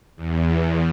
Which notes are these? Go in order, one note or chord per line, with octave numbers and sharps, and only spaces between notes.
E2